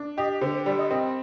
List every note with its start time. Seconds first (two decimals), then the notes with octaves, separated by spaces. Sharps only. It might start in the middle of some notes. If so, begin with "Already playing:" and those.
Already playing: D4
0.17 G4 D#5
0.41 D3 C5
0.54 C5
0.66 G3 D5
0.78 D#5
0.90 C4 D#5